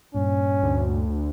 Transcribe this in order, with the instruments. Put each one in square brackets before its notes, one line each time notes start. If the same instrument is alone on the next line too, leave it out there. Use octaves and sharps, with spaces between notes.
[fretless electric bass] G2 A#2 [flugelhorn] C#4
[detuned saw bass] D2